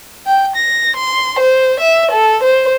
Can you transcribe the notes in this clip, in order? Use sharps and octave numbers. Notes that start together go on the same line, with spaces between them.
G5
A#6
C6
C5
E5
A4
C5